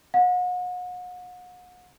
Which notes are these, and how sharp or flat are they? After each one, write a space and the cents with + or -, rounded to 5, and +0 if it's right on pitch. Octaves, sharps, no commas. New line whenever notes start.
F#5 -40